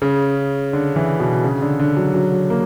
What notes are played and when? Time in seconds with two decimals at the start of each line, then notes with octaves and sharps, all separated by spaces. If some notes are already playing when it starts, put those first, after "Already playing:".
0.02 C#3
0.73 D3
0.96 E3
1.20 B2
1.44 C#3
1.62 D3
1.80 D3
1.97 F#3
2.14 F#3
2.50 A#3